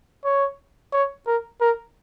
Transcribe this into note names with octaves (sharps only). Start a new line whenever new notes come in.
C#5
C#5
A#4
A#4